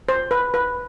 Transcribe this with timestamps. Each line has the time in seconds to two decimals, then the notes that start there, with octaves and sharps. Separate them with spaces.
0.09 C5
0.31 B4
0.54 B4